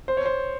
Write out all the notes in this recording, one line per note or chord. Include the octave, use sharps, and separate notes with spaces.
C5
C#5
C5